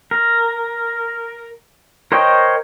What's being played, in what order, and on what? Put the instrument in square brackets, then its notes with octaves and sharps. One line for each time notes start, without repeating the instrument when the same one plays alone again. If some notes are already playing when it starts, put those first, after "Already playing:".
[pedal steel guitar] A#4
A#4 C5 C#5 D#5 G5